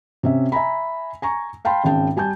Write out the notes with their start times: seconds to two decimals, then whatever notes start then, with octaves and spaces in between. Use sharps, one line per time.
0.23 C3 C#4 E5
0.52 E5 G#5 A#5 B5
1.22 G#5 A#5 C#6
1.65 F5 G5 A5 B5 C6
1.84 G#1 C#3 G5 A5
2.17 G3 G#5 A5 G6